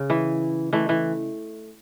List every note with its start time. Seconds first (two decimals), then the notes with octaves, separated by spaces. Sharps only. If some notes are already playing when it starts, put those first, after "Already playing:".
Already playing: C#3
0.10 E3
0.73 E3 A3
0.89 E3